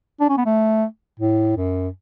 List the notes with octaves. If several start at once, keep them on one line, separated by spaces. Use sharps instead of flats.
D4
C#4
B3
A3
A2
F#2